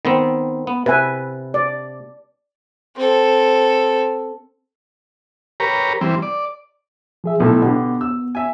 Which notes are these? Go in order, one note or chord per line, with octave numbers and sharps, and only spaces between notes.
D#3 B3 C4
B3
C3 B4 E5 G#5
D5
C4 A4
G4 A#4 B4 C#5 A#5
E3 G3 C4
D5
F3 G#4 E5
B1 A2 B3 A4
B2 D3 G4
E6
E5 G#5